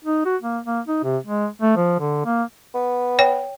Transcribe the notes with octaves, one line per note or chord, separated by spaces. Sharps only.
D#4
F#4
A#3
A#3
D#4
C3
G#3
A3
F3
D3
A#3
B3
C#5 G5